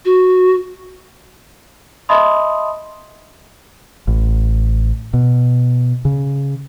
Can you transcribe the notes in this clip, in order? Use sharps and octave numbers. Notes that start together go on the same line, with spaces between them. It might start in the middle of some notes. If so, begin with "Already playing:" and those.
F#4
D#5 E5 A5 B5 C6 D#6
A1
B2
C#3